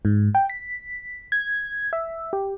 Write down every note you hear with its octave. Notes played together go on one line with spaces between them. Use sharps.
G#2
G5
B6
G#6
E5
G4